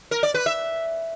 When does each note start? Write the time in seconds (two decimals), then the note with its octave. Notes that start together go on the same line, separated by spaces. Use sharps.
0.11 A#4
0.23 D5
0.34 B4
0.46 E5